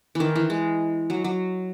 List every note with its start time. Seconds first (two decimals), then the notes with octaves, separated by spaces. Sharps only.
0.15 D#3 E3
0.36 E3
0.50 G#3
1.10 F#3
1.24 F#3